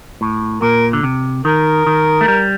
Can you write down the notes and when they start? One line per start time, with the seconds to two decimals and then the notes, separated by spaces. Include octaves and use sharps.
0.21 A2
0.62 A#2 A#4
0.93 D3
1.03 C3
1.45 D#3 A#4
1.86 D#3
2.21 A3
2.28 G3